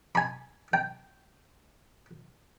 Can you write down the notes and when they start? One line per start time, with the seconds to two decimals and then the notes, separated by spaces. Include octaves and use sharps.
0.15 G#5 B5
0.73 G5